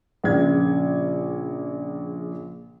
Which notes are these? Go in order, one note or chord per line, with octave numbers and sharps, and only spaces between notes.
A#1 C#3 G#6